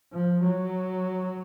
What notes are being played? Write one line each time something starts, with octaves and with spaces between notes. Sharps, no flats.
F3
F#3